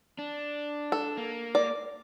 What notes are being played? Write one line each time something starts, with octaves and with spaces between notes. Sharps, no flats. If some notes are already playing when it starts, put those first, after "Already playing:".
D4
A4
A#3
D5